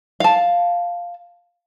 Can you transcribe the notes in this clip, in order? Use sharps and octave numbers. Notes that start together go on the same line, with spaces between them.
F5 A5